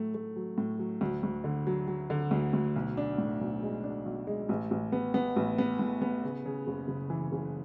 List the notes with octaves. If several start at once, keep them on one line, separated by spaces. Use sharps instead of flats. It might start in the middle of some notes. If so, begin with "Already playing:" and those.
Already playing: A2 F#3 A3
A3
F#3
A2
F#3
D2
D2
D3
F#3
F#3
D3
D2
D2
B1
D4
A2
B1
G#3
D4
B1
G#3
A1
A1
B3
B3
A1
B3
A2
B3
C#3
C#3
F#1
F#1
E3
F#1